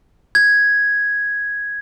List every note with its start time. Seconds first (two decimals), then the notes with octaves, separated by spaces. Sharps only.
0.35 G#6